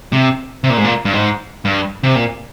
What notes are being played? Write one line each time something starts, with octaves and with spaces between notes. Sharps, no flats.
C3
C3
A#2
G#2
A#2
G2
G#2
G2
C3
A#2